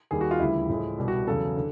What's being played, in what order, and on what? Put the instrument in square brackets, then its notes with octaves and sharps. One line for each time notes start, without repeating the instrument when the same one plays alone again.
[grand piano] D#2 D#3 G3 G#4
F#4
F4
D2 C#3 E3 G3 E4
A2 F3 G#3
C2 B2 G3
F#4
E2 C#3 F#3 A4
D3